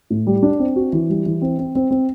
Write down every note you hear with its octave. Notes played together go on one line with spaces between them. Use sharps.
A2
G3
D4
C4
F#4
E3
G3
E3
C4
C4
C4
C4